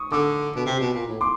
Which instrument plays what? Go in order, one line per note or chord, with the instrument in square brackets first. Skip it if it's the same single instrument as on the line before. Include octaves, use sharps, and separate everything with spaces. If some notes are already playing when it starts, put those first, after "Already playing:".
Already playing: [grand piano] C#6 D#6
[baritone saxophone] D3 [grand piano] D6 E6
[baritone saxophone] B2
C3
B2
A#2
A2
[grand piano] C6 D6